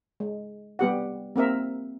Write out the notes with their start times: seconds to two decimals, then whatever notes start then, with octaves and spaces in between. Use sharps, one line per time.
0.20 G#3
0.79 G3 B3 G4 F#5
1.36 A#3 C4 A#4 E5